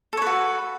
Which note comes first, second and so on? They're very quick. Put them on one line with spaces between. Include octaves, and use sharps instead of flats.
A4 C#5 B4 F#4